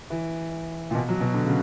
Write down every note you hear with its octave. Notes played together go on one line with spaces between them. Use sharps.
E3
A#2
B2
F#3
B2
D3
C#3